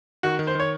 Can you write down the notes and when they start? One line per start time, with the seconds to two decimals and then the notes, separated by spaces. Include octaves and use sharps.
0.23 D#3 F#4
0.39 D#3
0.47 C5
0.55 D#3 C#5